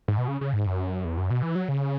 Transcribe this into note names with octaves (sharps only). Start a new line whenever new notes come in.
G#2
B2
C#3
C#3
G#2
F#2
E2
F#2
B2
E3
F#3
C#3